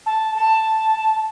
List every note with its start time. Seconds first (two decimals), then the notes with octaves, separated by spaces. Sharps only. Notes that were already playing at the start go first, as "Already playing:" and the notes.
0.06 A5
0.35 A5